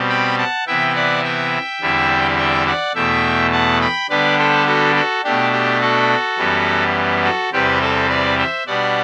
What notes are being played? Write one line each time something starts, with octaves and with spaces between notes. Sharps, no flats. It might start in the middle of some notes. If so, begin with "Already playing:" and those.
Already playing: B2 G3 C4
G5 B5
F#5 A5
C3 E3 B3 E4 E5 G5
D5 F#5
E5 G5
E2 D3 G3 C4 E4
E5 G5
D5 F#5
E2 B2 A3 E5 G5
F#5 A5
G5 B5
D3 G3 B3 D4 B4 D5
A4 C5
F#4 A4
F#4 A4
B2 A3 D4 G4
G4
F#4 A4
F#2 E3 G3 B3
F#4 A4
E2 C3 G3 C4 G4 B4
A4 C5
B4 D5
C5 E5
B2 G3 B3 D4 D5 F#5